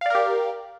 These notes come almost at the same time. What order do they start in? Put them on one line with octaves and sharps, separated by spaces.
F5 D5 A#4 G4